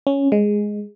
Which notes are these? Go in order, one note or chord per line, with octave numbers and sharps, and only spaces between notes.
C#4
G#3